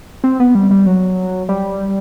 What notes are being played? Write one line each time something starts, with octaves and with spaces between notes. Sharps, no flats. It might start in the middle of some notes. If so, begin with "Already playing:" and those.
C4
B3
G3
G3
F#3
G3